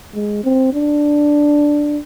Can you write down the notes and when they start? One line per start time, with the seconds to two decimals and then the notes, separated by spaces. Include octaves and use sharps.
0.14 G#3
0.44 C4
0.74 D4